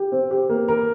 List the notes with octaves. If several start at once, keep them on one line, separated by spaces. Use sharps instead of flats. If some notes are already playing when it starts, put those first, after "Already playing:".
Already playing: G4
C4
G4
A#3
A#4